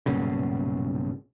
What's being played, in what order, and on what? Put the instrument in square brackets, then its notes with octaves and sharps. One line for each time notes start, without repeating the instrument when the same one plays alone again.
[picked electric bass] B1 G2 A#2 C#3